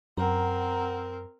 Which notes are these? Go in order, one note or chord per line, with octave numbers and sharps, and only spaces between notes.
F#2 C4 A#4 F#5 A#5